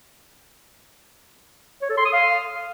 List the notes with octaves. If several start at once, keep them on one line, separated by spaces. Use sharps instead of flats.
C#5
A4
C6
D#6
F5